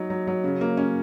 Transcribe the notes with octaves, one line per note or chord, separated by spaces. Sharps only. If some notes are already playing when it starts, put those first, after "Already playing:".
Already playing: F#3 D#4
F#3
F#3
C#3
A#3
C#4